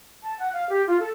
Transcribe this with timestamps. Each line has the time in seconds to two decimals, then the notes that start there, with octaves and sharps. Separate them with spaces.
0.23 A5
0.39 F#5
0.53 F5
0.70 G4
0.87 F4
1.00 A4